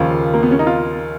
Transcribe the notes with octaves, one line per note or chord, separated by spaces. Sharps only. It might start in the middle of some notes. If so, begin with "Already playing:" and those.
Already playing: D#2 C#3 F3 F4
A#3
B3
C#4
D#4
F4